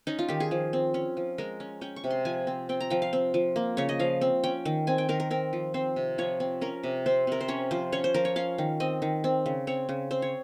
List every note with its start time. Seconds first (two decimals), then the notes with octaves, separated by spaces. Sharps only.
0.07 C#4 D#4
0.19 F4
0.29 D#3 G4
0.40 G#4
0.51 F3
0.73 C4
0.94 C#4
1.17 F3
1.38 G#3 A#4
1.60 C#4
1.81 C#4 G5
1.96 C#6
2.04 C3
2.10 C6
2.25 F3 G#5
2.47 C4
2.69 C4 G5
2.81 A#5
2.90 F3 G5
3.02 F5
3.13 C4
3.34 F3
3.56 A#3
3.77 C#3 C#5
3.89 D#5
3.99 F3 F5
4.21 C4
4.43 C#4 G5
4.65 D#3
4.87 C4 G#5
4.98 G5
5.09 D#3 A#4
5.20 A#4
5.31 C4 A#4
5.53 F3
5.74 C4 C5
5.96 C3
6.18 F3 C#5
6.40 C4
6.61 C#4 A#4
6.84 C3
7.06 C4 C5
7.27 C3 A#4
7.41 C5
7.48 C#4 C#5
7.71 F3 C5
7.93 C#4 C#5
8.04 C5
8.14 F3 A#4
8.25 C#5
8.36 C#4 F5
8.58 D#3
8.80 C4 D#5
9.02 D#3
9.24 C4
9.46 C#3
9.67 C4 C#5
9.89 C#3
10.11 C4 C5
10.22 C#5